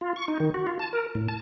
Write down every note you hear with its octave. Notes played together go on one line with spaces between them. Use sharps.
F4
C#6
D#4
D#3
F#4
F4
A5
A#4
A2
A5